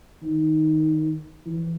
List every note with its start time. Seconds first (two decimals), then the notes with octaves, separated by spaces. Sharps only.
0.23 D#3
1.46 E3